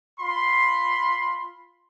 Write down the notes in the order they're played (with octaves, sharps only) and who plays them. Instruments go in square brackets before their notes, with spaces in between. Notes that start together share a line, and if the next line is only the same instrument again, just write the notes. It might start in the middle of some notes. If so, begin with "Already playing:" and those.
[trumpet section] F4 B5 C6